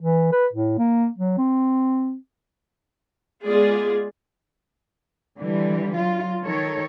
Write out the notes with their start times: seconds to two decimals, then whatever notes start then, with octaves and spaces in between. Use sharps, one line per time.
0.01 E3
0.32 B4
0.53 A2
0.78 A#3
1.18 F#3
1.38 C4
3.44 G#3 B3 F4 G#4 D5
5.39 D3 E3 G3
5.96 F#3 F4
6.43 D#3 A4 C#5